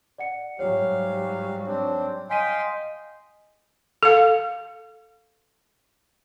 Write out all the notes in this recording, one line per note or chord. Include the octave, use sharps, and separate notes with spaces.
D5 F#5 C#7
G#2 F#3 G3 G4 C#5 F5
C4 D4 C#5
D#5 F5 G5 G#5 C6 B6 D#7
A4 F5